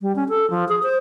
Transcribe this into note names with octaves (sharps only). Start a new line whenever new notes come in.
G3
C#4
A4
F3
G#4
C5